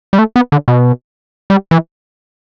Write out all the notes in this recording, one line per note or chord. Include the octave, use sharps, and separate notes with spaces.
G3
A3
B3
D3
B2
G3
E3